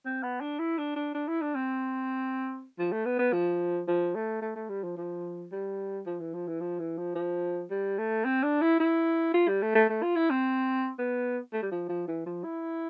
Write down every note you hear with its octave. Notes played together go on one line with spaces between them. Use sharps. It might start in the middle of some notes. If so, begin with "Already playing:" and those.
C4
B3
D4
E4
D4
D4
D4
E4
D4
C4
F3
A3
B3
B3
F3
F3
A3
A3
A3
G3
F3
F3
G3
F3
E3
F3
E3
F3
E3
F3
F3
G3
A3
C4
D4
E4
E4
F4
G3
A3
A3
A3
F4
E4
C4
B3
A3
G3
F3
F3
E3
F3
E4